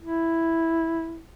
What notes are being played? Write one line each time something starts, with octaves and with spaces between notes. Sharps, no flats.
E4